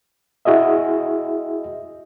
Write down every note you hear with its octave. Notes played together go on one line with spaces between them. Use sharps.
E4 F#4 G#4 D#5 E5